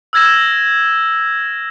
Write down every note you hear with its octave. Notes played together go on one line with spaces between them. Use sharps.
E6 F6 G#6 A#6 E7